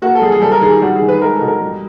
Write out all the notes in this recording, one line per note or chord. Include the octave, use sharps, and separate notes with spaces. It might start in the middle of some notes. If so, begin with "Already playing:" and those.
A#3 F#4
A4
G3 G#4
G#4
G3 A4
A#4
D#3 G#4
G4
G3 F#4
G#4
D#3
B4
G#3 A#4
A4
B2
A#4
G3